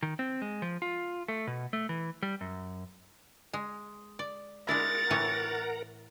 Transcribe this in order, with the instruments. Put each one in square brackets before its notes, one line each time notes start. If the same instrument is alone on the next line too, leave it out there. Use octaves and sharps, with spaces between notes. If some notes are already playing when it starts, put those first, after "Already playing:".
[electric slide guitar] D#3
C4
G#3
F3
F4
A3
B2
A3
E3
G3
F#2
[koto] G#3
D5
[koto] G#3 D4 E4 [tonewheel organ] A#4 F#5 A#5 [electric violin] A6
[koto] A2 E3 C#5